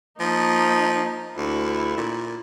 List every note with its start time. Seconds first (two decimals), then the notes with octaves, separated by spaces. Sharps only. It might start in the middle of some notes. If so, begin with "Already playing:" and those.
0.20 F3 A#3 D#4
1.37 D2 E4
1.97 A#2